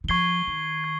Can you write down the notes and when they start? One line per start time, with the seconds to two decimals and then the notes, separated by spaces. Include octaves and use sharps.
0.04 D#3
0.08 F3 C#6 G#6 C7 G7
0.47 D#3
0.84 G#6